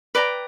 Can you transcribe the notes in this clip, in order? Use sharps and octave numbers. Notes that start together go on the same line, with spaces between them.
B4 D5 G5 A#5